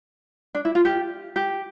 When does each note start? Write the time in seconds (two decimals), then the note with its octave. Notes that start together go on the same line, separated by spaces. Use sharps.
0.55 D4
0.65 E4
0.75 F4
0.85 G4
1.36 G4